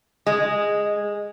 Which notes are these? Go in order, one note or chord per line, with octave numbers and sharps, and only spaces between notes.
G#3